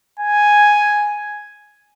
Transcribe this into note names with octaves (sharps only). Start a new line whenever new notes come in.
G#5